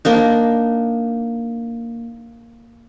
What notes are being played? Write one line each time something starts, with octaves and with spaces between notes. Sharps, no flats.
A#3 D4 D#4